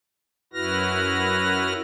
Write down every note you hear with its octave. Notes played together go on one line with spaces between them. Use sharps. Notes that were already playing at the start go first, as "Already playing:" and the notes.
F#2 E4 F#4 B4 F6 A#6